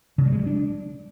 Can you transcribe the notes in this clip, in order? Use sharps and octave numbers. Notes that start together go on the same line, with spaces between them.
C#3
G3
G#3
G3
D4